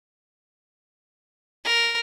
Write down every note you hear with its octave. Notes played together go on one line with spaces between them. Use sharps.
A#4